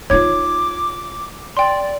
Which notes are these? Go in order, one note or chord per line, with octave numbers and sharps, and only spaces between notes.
D#4 F4 C#5 D6 G#6
D5 G5 C6